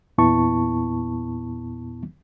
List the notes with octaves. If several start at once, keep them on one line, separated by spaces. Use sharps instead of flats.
E2 A#2 B3 E4 A5 C#6